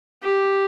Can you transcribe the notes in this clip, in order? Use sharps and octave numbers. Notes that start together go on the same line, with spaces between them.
G4